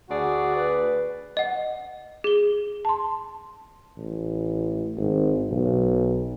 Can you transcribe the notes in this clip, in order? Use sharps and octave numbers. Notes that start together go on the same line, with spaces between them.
D2 F#4 G#4 D5
B4
D#5 F#5
G#4 G7
A5 C6
A1
G#1
B1